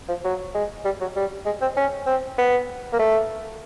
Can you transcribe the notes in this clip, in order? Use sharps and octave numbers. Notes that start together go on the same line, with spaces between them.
F3
F#3
G#3
G3
F#3
G3
G#3
C4
C#4
C4
B3
A#3
A3